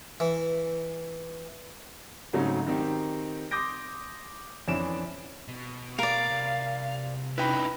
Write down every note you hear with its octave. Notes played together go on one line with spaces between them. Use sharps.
E3
G#2 C#3 F#3 A3 C4 D#4
D#3 C4 D#4 G4
C6 D6 D#6 G6 A#6 D7
F2 E3 C#4 D4 D7 E7
B2
A#4 D5 F5
C2
C#4 D#4 E4 B4 G5 B5